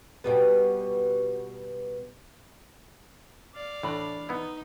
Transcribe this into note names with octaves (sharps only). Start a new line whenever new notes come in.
B2 G3 B3
D5 F5
A2 E3 D4 B5
B3 D#4 E4